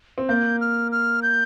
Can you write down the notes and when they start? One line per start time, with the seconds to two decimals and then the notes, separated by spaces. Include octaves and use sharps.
0.18 C4
0.29 A#3 G6
0.61 F6
0.92 F6
1.23 G6